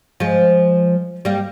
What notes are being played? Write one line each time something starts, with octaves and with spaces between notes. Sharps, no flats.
F3 G#3
G3 A#3